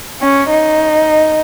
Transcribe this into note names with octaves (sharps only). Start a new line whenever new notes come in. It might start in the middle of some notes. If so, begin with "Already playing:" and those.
C#4
D#4